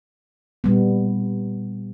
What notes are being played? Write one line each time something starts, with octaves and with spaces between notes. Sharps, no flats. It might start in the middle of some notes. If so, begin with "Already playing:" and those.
A#2 G3 B3